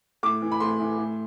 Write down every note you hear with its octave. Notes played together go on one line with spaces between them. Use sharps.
A2 D6
E3
B5
A2 C6
E3
A2